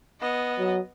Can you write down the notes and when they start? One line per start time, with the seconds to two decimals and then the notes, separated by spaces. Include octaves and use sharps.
0.20 B3 D#5
0.59 F#3